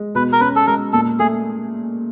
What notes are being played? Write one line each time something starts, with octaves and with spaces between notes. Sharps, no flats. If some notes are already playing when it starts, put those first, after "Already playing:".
Already playing: G#3
B2 B4
A#4
C#4 B4
A4
G#3 A#4
A#2 A4
A3 G#4